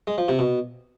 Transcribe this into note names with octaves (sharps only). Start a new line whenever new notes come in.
G#3
F3
C3
B2